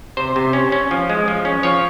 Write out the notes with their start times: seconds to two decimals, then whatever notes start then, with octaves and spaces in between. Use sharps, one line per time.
0.17 C3 C5
0.36 C3
0.53 C#4
0.72 C#4
0.91 F3
1.10 G#3
1.28 F3
1.45 C#4
1.63 F3 C#5